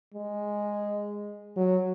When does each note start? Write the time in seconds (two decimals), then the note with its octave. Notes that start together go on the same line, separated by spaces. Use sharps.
0.14 G#3
1.57 F#3